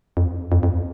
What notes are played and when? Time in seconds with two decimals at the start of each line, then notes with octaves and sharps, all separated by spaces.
0.17 F2
0.52 F2
0.63 F2